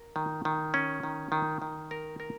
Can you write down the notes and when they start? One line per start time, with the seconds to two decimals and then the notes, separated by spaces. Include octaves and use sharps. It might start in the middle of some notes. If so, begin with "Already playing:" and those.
Already playing: A#4
0.16 D#3
0.45 D#3
0.74 C#4
1.03 D#3
1.32 D#3
1.62 D#3
1.91 A#4
2.20 A#4